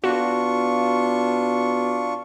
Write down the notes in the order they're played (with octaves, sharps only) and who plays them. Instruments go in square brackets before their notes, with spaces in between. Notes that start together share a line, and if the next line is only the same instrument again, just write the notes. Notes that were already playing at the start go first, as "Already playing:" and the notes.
[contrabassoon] B2 [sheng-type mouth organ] D4 F4 C#6 [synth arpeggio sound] F#4